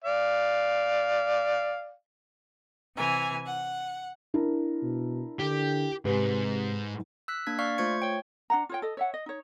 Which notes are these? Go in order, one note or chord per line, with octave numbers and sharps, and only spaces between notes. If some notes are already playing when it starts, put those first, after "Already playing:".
D5 F5
C3 E3 G#5
F#5
D4 E4 A#4
B2
D3 G4
G#2 C3 G4 B4
E6 F#6 B6
A#3 D4 G#6 B6
D5 F5 C#6 F6 B6
A3 F4 C5 C#6 G#6 C#7
C#5 G5
D4 F#5 A#5
F4 C#5 G5
A4 D#5
C#5 E5 F#5
D#5
D#4 C#5